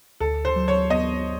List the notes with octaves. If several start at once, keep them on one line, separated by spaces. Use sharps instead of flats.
D2 A4
C5
F#3
C#5
B3 D#5